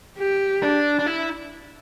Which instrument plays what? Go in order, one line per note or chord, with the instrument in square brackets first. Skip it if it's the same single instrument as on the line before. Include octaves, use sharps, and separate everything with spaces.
[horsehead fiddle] G4
[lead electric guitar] D4
D4
E4